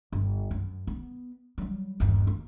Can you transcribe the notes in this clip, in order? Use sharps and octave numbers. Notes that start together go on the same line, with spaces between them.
G1
F#2
B3
F#3 G3
G1 D#2
A#3